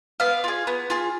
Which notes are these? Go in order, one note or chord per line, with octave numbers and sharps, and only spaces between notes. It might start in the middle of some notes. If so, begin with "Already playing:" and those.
B3 D5 F5
F4 G#4
B3
F4 G#4